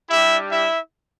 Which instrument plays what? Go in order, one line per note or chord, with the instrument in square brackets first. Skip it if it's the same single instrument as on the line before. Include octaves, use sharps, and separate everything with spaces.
[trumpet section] G3 D4 E4 G4 E5
E4 E5